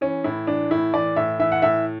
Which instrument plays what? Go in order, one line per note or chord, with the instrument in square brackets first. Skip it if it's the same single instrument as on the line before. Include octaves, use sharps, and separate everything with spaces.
[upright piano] E3 C#4
A2 E4
E3 D4
A2 E4
E3 D5
A2 E5
E3 E5
F#5
A2 E5